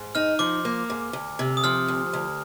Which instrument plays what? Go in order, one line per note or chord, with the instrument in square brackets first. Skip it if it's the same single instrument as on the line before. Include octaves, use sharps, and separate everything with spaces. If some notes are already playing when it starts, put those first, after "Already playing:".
Already playing: [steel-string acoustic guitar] G#2
[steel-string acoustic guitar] D#4 [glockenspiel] F6
[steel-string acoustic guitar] F3 [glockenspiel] D6
[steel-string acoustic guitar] A#3
G#2
D2
C3
[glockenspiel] D#6
[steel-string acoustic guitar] F3 [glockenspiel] F6
[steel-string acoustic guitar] D2
D2